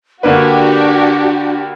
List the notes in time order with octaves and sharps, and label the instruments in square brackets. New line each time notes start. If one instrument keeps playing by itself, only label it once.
[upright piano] D3 A#3 B4 [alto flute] D4 [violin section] F#4 G4